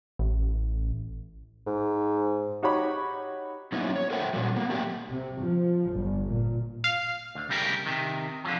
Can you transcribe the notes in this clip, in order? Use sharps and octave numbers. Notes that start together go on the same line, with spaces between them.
A1
G#2
D#4 F#4 G4 C#5 B5
F#3 A#3 B3 C#4 D#4 E4
C#5
A4 A#4 C5 E5 F#5 G5
A#2 F#3 G3
A#3 B3
F#3 A3 A#3 G4
C3
F3
G1
A#2
F5
D2
C2 C#3 G3 G4 A#4
C3 D#3
D3 F3 F#3